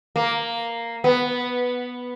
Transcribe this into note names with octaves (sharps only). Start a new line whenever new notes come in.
A#3
B3